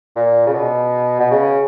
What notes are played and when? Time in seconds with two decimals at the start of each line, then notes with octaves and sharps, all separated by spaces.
0.16 A#2
0.47 C#3
0.54 B2
1.20 B2
1.31 C#3